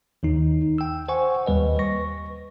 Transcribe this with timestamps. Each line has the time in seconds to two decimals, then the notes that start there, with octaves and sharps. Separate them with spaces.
0.23 D#2 D#3 D#4
0.78 G5 E6
1.08 C5 F#5 G#5 C#6
1.46 D#2 G3 B4 D#5
1.79 C#6 A#6